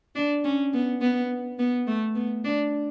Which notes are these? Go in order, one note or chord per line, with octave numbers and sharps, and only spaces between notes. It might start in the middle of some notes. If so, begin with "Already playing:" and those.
D4
C#4
B3
B3
B3
A3
B3
D4